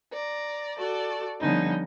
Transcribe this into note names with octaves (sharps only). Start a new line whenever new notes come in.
D5 A#5
F#4 A4 D5
D3 F3 G3 B3 C#4 D#4